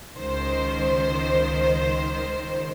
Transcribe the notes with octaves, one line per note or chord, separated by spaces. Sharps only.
C#2 D#3 C5